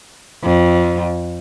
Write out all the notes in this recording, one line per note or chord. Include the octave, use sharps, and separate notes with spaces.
F2